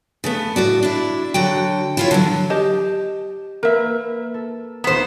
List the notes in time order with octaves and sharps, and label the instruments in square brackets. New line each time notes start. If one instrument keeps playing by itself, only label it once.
[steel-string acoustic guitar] C#3 A3 B3
A2 F#4 D5
D4 E4
D3 F#3 F#4 G5
E4 F4 C#5
D3 E3 F#3
[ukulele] G4 D#5 A5
[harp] A#3 B4 [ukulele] A#4 E5
[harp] A4
[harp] D#1 C4 D7 [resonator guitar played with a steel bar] B3 C5